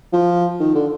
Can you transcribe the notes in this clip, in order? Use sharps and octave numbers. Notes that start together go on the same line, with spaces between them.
F3
D#3
D3